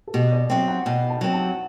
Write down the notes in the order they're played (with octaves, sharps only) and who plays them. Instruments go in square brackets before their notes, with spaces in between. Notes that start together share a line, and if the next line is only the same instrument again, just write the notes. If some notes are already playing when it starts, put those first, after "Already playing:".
[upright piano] A4
[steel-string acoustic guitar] B2 [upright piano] G4
[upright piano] D5
[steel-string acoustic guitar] F#3 C4 [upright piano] E5
[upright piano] F#5
[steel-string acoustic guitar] B2 [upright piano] G5
[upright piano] A5
[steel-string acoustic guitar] F#3 C4
[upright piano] A5